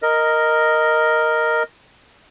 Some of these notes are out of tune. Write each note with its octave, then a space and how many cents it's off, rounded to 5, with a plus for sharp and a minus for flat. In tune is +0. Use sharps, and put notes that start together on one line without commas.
A#4 +0 D#5 +0